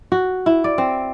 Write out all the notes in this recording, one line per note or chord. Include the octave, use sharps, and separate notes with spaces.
F#4
E4
D5
C4